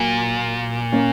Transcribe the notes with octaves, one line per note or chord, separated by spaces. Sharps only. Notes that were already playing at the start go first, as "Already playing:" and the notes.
Already playing: A#2 F#3 A#3
A#3 C#4